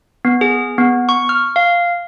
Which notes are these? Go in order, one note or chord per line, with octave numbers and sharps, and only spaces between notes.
B3
G#4
B3
C#6
F6
F5